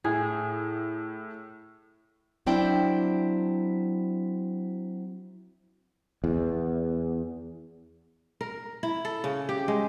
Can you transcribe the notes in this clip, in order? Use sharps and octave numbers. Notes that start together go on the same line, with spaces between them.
A2 G#4
F#3 C4 D4 E4 G5
E2
A#4
E4
A4
C#3
G4
G#3